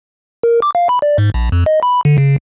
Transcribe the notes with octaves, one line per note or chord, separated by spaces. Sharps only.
A#4
D6
F5
B5
D5
G#2
A#1
F2
D#5
B5
D3
C#3